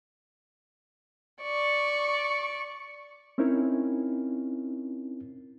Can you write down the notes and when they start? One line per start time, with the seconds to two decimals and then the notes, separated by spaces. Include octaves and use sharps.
1.42 D5 C#6
3.38 C4 C#4 D#4 E4 A#4